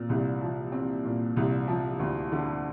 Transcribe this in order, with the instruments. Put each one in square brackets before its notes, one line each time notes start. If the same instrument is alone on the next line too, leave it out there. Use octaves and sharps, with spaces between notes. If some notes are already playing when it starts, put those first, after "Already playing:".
Already playing: [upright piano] A#2 C4
C2
F3
C4
A#2
C2
F3
D2
D3